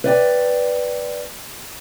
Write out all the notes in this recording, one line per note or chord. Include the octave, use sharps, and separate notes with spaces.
B4 D5 G5